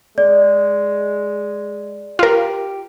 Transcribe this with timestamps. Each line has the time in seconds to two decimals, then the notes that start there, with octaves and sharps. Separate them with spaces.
0.18 G#3 D5
2.19 F4 G4 A#4